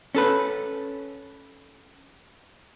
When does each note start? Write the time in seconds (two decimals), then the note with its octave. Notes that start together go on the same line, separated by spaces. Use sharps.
0.15 C#4 A4 B4